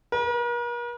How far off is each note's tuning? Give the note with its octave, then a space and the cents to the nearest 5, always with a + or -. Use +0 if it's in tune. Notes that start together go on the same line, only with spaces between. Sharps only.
A#4 +45